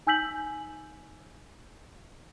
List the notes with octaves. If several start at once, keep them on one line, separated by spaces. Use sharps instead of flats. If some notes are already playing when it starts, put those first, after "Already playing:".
D#4 G#5 E6 G6 B6 F#7